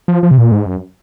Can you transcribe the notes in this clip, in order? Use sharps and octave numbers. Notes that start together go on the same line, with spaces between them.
F3
F3
C3
A#2
G#2
F#2